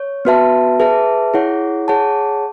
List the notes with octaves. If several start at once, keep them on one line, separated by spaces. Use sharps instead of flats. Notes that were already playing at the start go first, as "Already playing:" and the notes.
Already playing: C#5
B3 F#4 B4 E5 A5
G#4 B4 E5 A5
E4 G#4 C#5 F#5
G#4 C#5 F#5 A5